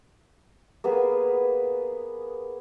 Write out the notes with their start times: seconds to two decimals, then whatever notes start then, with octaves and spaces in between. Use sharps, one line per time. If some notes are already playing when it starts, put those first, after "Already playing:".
0.84 A#3 B3 G#4 B4